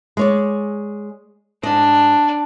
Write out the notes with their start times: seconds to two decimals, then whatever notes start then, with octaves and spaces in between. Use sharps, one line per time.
0.17 G#3 C#5 D5
1.63 G#2 D4 D#5